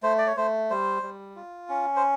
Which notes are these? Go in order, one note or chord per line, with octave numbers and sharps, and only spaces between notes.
A3 C5
D5
C#5
A3 C5
G3 C5
G3
F4
C#4
C5